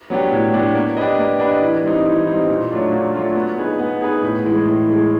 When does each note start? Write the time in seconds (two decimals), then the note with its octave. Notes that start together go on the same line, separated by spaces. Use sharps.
0.10 F#3 B3 D4 G4
0.32 A2
0.54 F#3 B3 D4 G4
0.75 A#3
0.97 D4 G4 B4 D#5
1.18 A#3
1.40 D4 G4 B4 D#5
1.62 E3
1.84 G3 C4 D#4
2.05 E3
2.27 G3 C4 D#4
2.49 A#2
2.71 F#3 A3 D4 F4
2.92 A#2
3.14 F#3 A3 D4 F4
3.35 B3
3.58 D#4 G#4 B4
3.79 B3
4.01 D#4 G#4 B4
4.22 A2
4.44 E3 G#3
4.65 A2
4.87 E3 G#3